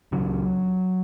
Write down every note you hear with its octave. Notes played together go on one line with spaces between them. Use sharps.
C#2 C#3 F#3